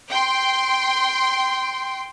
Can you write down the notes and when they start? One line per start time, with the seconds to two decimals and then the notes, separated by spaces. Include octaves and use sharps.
0.10 G5 C6